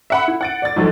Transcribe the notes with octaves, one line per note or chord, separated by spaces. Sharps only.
E5 F#5 B5
E4
F#5 A6 D7
D5 A6
G#2 F3 F#3 A3